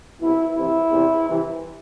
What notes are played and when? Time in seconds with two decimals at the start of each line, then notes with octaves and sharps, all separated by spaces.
0.19 C2 B2 E4
0.55 C2 C3 E3 E4
0.91 E2 C3 E3
1.27 C2 C3 E3